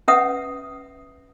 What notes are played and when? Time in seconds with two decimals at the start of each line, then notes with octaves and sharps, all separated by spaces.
0.08 C#4 B4 E5 F#5 D#6